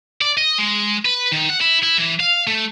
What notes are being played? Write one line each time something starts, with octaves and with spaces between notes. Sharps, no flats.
D5
D#5
G#3
B4
D#3
F#5
E4
E4
E3
F5
A3